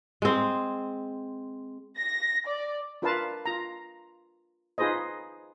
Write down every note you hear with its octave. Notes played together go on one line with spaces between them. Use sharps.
G#3 C4
A#6
D5
D4 F4 A#4 B4 F5 A5
F4 A#5
D#4 F4 G#4 B4 C5 D#5